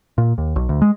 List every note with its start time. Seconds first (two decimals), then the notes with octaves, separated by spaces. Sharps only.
0.18 A#2
0.38 D#2
0.56 B1
0.69 D2
0.82 G#3